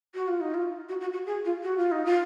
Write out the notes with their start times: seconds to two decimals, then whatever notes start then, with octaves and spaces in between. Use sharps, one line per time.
0.15 F#4
0.28 F4
0.41 D#4
0.54 F4
0.89 F#4
1.01 F#4
1.13 F#4
1.26 G#4
1.45 F4
1.63 F#4
1.78 F4
1.92 D#4
2.06 F4